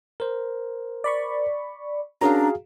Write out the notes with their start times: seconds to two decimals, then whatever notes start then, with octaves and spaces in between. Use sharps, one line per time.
0.20 A#4 C5
1.04 D5 B5 C#6
2.21 C#4 D4 F#4 G#4 A#4 F5 A#5